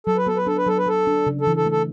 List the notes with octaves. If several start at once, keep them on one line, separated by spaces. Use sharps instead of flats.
F#3 A4
B4
B3 A4
B4
D4 A4
B4
F#3 A4
B4
F#3 A4
D4
C#3
A4
E3
A4
A3
A4